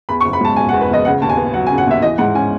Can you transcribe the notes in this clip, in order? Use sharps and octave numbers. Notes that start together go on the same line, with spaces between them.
E2 B5
C#6
F#1
B5
G#3 A5
B2 G#5
F#5
E2
B4
F#1 D#5
C#3 F#5
D#2 A5
G#5
B3
F#3 F#5
G#5
C#3
F#5
D#2 E5
E3 D#5
G#2 F#5
C#4 G#5